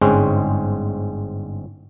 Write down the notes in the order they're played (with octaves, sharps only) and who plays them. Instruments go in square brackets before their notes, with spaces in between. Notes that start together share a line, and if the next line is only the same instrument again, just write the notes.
[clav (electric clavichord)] G1 G#2 G#3 C4 C#4